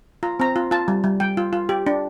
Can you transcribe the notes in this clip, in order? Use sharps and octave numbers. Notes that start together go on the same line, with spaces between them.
F4 A#5
C4 A#5
F4
F4 A5
G3
G3
G3 G5
F4
F4
G4
D4